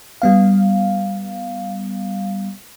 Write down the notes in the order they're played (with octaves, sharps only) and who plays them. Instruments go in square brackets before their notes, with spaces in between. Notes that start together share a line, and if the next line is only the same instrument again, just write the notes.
[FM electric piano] G3 B3 F5